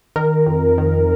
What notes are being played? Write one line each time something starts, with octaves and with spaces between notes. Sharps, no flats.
D#3 A#4
F2
D#3